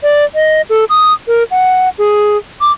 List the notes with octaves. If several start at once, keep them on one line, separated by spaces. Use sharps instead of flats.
D5
D#5
A4
D#6
A#4
F#5
G#4
D6